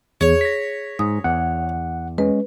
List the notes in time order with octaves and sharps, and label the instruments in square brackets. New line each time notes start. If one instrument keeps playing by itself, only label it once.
[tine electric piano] E2 [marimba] G#4 [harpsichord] C#5
[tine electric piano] A#6 B6
[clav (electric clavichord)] G#2 [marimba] D#6
[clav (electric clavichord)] E2 [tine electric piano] F#5
[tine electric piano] G#3 C#4 [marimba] B4